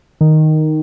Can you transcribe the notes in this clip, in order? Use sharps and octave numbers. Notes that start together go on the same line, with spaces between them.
D#3